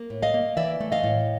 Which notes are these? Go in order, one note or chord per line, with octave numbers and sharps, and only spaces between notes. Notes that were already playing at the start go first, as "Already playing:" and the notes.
Already playing: A#3
A2
D#5 F5
A#3
E3 D5 E5
A3
D#5 F5
A2